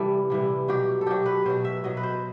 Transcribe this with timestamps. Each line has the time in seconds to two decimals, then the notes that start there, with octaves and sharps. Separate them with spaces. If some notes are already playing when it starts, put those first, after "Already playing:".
Already playing: C3 E3 G3 A4
0.30 C3 E3 G3
0.68 B2 F#3 G4
1.01 A4
1.07 B2 F#3 G4
1.26 B4
1.46 B2 F#3 C5
1.65 E5
1.84 B2 F#3 D#5
1.97 B4
2.03 C5